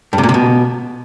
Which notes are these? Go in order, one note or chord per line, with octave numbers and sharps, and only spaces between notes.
G2
C3
A#2
C3
B2